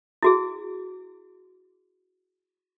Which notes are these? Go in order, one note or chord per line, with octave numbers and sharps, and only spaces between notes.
E4 F#4 G#4